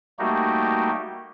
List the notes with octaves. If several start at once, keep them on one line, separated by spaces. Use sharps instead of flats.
G3 A3 A#3 D#4 F#4 G4